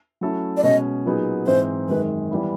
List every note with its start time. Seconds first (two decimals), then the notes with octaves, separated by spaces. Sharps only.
0.21 F#3 A3 C#4 E4 A4
0.57 D5
0.63 B2 G#3 C#4 D#5
1.05 A#2 F#3 B3 D#4 G#4
1.47 G#2 E3 G#3 C4 D#4 C5
1.89 F#2 D#3 G#3 B4
2.31 E3 G3 B3 E4